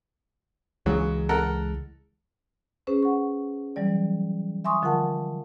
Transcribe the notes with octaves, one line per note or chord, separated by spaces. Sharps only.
C#2 C#3 E3 F#3 G#3
A4 A#4 F#5
C#4 G#4 B4 C5
F#5 C#6
E3 F#3 G3 D5
E5 G#5 C6 C#6 D#6
D3 F3 F4 A#4 F#5 A5